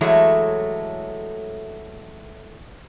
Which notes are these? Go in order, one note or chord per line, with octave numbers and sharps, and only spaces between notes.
E3 F#3 G#3 A3 A4 C#5